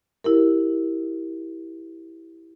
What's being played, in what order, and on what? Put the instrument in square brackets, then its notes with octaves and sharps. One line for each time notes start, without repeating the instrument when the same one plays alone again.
[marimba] E4 G4 A#4